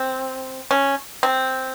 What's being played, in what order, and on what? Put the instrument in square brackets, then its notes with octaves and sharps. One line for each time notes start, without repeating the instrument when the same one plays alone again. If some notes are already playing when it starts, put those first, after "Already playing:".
Already playing: [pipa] C4
C#4
C4